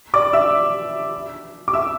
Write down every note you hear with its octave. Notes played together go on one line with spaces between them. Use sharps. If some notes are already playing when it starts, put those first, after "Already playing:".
D5 D6
E5 E6
D6
E5 E6